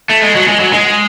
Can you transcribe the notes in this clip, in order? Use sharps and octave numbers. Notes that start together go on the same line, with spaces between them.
A3
G#3
F#3
G#3
F#3
G#3